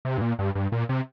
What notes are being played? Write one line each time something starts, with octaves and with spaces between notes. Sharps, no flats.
C3
G2
A#2
G2
G2
A#2
C3